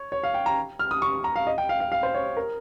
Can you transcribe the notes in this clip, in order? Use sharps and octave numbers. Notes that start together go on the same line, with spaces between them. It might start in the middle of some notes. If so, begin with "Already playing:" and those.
Already playing: C#5
C#5
F5
G5
A#5
F6
D#6
C#6
A#5
F5
D#5
G5
F5
F5
F5
C5
C#5
A#4